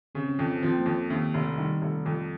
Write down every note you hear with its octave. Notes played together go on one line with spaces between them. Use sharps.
C#3 C4
C#4
F2 C4
F3 C4
A#3
F2
D#2 D#3
F1
D#3 G3
F1
F2